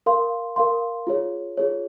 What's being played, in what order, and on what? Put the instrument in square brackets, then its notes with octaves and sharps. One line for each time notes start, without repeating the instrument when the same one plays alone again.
[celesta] A#4 F5 C6
A#4 F5 C6
F4 G#4 C#5
F4 G#4 C#5